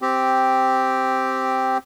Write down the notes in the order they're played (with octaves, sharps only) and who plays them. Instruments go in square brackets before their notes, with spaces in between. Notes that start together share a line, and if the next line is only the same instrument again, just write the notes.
[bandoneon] C4 G4